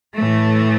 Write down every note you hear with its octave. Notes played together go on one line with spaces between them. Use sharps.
A2 E3 A3